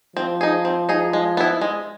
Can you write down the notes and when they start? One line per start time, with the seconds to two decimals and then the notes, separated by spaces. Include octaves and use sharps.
0.17 F3 C4
0.41 D#4 G#4
0.65 C4
0.89 D#4 G#4
1.13 G#3
1.37 B3 E4
1.61 G#3